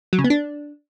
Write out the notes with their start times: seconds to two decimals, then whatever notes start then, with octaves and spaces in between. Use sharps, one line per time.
0.13 F#3
0.19 C#3
0.24 B3
0.30 D4